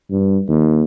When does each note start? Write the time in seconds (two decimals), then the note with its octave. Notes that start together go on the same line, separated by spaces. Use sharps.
0.10 G2
0.48 D#2